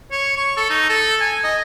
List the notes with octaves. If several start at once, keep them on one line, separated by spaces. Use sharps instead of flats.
C#5
C#6
A4
D#4
A4
G#5
D#5